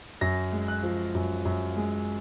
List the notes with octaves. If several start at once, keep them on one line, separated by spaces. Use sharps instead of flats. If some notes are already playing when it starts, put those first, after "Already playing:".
F#2 A#6
G#3
F#6
F3
F#2
F#2
G#3